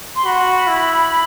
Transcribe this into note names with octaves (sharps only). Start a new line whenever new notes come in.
C6
F#4 B5
E4